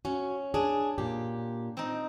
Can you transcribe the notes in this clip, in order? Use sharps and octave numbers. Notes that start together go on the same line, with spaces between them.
C#4 F#4
D4 G#4
A#2 G4
C4 D#4